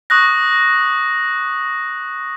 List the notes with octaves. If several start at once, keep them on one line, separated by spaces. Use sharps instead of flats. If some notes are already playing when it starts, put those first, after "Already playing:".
C#6 D#6 F#6 A#6